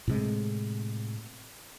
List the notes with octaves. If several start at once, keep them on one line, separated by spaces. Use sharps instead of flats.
A2 C3 G#3